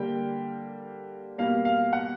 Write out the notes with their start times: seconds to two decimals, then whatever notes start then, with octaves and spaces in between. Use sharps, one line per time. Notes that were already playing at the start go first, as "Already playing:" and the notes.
Already playing: D3 G3 A#3 G5
1.38 B2 G3 A#3 F5
1.65 F5
1.93 F#5